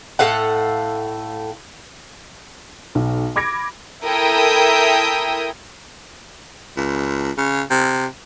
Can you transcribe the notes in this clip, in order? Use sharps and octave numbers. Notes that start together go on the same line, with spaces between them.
A2 A4 F5 F#5
B1
B5 D6 G#6 A#6 D7
E4 A4 A#4 E5 G5 D#6
C#2
C#3
C3